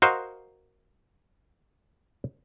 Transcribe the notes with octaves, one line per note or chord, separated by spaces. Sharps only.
F#4 A#4 C5 D#5 F5